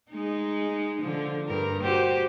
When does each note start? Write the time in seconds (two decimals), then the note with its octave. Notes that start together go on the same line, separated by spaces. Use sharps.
0.10 G#3 D#4
1.01 D3 F3
1.48 G2 A#4
1.83 F#4 G4 C5